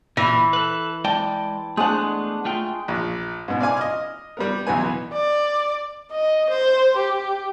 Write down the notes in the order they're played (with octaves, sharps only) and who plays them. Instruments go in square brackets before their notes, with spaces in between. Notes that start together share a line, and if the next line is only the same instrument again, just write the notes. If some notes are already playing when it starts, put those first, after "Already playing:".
[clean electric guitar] A#2 [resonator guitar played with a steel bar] E3
[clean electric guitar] A4 B4
[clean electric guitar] G#3 D5 G5 [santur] A5
[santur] G#3 D4 [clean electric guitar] A3 B3 F#5
[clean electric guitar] A3 F4 G5
[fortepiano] A#1
G#2 B2
D5 F5 G#5 D6
D#5 F6
G3 B3 A#4
B1 E2 B3 G#5
[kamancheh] D5
D#5
C5
G4